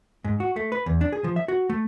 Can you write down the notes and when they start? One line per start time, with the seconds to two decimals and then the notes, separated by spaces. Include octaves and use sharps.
0.24 G#2
0.40 F#4
0.56 A3
0.72 B4
0.86 E2
1.01 D4
1.12 G#4
1.24 F3
1.36 E5
1.48 F#4
1.69 A3